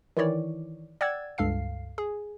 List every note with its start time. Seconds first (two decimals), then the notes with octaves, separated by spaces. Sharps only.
0.17 D#3 E3 E4 C#5 D5
1.01 D5 F#5 G5 E6 G#6 A6
1.38 C#2 G2 A4 F5 C7
1.98 G#4